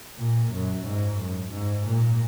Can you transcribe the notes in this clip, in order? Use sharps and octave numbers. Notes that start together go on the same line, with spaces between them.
A#2
F#2
G#2
F#2
G#2
A#2